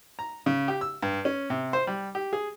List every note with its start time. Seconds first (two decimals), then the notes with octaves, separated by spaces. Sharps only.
0.19 A#5
0.46 C#3
0.68 G4
0.81 E6
1.02 G2
1.25 C#4
1.50 C3
1.73 C5
1.87 G3
2.15 G4
2.33 G#4